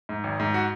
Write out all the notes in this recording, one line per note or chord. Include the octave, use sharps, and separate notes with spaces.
G#2
G#1
G#2
F#4